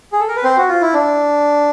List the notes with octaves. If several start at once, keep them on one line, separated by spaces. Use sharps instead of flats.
G#4
A4
A#4
B4
C4 C5
F#4
F4
E4
D4